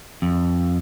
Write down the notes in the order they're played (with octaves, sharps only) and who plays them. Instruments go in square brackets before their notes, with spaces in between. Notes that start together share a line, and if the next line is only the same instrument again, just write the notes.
[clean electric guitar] F2